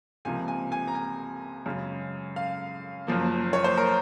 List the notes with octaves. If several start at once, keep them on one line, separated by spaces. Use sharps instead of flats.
C#2 C3 F3 A#3 G#5
G#5
G#5
A#5
G#5
F#2 C#3 G#3
F5
F#1 F#2 F3 A#3
C#5
C5
A#4